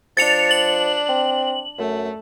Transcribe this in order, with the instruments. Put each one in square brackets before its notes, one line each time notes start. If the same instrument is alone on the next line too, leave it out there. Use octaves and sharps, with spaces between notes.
[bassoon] F3 [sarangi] D4 [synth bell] A6 C#7 F7
[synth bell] F#7
[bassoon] C4
[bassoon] F#2 [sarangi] A3